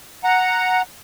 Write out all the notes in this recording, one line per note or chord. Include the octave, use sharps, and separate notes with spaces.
F#5 A#5